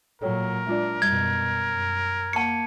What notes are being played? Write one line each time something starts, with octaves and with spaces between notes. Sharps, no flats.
A#2 F#3 A4 A#4 C#5 G5
G#3 D4 F4 D5
F#2 B2 G3 G#6
F#2
A#3 F#5 A5 C#6 C#7